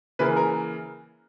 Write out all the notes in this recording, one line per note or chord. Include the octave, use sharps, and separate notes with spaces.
C#3 E3 A#3 B4
A#4